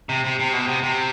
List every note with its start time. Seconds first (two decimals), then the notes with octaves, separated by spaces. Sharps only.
0.09 C3
0.25 C3
0.39 C3
0.53 B2
0.68 C3
0.83 C3